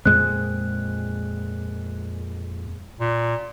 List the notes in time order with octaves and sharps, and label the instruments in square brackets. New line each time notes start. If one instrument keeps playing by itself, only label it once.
[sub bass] F2 [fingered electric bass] A#2 G#3 C4 [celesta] F#6
[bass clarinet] A#2